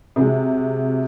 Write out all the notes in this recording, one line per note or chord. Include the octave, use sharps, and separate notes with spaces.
C3 F#3 G#3